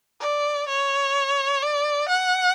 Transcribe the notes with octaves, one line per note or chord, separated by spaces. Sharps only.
D5
C#5
D5
F#5